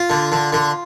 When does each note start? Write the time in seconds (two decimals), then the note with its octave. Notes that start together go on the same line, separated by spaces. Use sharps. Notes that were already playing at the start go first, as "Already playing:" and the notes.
Already playing: F4
0.10 D3
0.32 D3
0.53 D3